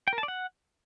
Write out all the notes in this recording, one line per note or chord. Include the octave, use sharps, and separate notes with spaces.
G5
A#4
A5
D5
F#5